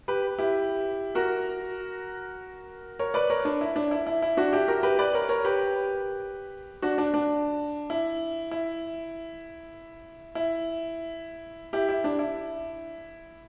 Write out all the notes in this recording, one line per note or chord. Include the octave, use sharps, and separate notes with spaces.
G4 B4
E4 G4
F#4 A#4
A#4 C#5
B4 D5
A#4 C#5
D4
E4
D4
E4
E4
E4
D4 F#4
E4 G4
F#4 A#4
G4 B4
B4 D5
A#4 C#5
A#4 C#5
G4 B4
D4 F#4
D4
D4
E4
E4
E4
E4 G4
E4
D4
E4